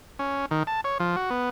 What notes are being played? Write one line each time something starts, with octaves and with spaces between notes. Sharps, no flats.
C#4
D#3
A5
C#5
F3
F#4
B3